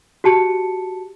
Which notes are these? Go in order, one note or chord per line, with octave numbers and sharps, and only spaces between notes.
F#4 G4 A5 C#7